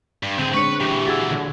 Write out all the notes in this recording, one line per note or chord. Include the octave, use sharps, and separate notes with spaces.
G2
A2 D3 C4 G#4 G6 D#7
G#3 D4 B4 C#5 C#6 C#7
A#2 E3 G4
F#4 G#4 F#5 E6 G#6 A6
D3